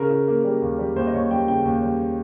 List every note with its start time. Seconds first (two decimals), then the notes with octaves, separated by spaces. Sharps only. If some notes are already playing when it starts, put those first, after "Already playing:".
Already playing: C#3 A#4
0.10 C#3
0.28 A#3
0.45 G3
0.62 D#2
0.79 G3
0.96 D#2 C5
1.07 D#5
1.14 D#2 C#5
1.31 G3 G5
1.48 C#3 G5
1.65 D#2
1.83 G3